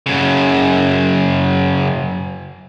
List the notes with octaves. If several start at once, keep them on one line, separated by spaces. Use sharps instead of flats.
F#2 C#3